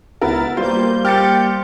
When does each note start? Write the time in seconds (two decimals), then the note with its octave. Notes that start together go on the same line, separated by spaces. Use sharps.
0.22 C#2 B3 E4 A#4 A6
0.57 G3 A#3 F4 C5 G6
1.05 G4 F6 A6 C#7